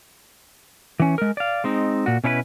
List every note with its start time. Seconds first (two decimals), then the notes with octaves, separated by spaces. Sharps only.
1.00 E3 C#4
1.18 G#3 A#4
1.37 D5 F5
1.64 G#3 C4 D#4
2.06 A#2 F#4
2.24 B2 C#4 E4 A4 B4